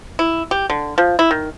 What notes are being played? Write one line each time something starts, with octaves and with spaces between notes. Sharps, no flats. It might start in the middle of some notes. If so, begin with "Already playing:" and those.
E4
G4
D3
F3
E4
D#3